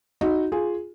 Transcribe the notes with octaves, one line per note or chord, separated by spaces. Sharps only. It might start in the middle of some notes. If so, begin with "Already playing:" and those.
D#4 F#4
F4 G#4